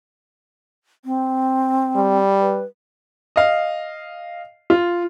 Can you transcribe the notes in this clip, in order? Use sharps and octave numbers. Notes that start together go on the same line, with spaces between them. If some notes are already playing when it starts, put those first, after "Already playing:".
C4
G3
B4
D#5 F5
F4